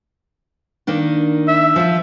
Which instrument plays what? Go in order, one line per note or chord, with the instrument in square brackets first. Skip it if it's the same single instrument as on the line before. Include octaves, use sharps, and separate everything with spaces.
[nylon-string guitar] D#3 A#3 D4
[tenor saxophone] E5
[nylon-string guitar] F3 F4